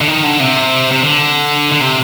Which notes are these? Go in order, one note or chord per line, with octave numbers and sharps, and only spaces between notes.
D3
D#3
D3
C3
C3
D3
D3
C3